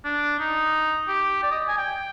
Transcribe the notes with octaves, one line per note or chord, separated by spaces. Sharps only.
D4
D#4
G4
D5
D#5
G#5
G5